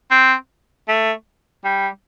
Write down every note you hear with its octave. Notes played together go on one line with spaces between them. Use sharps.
C4
A3
G3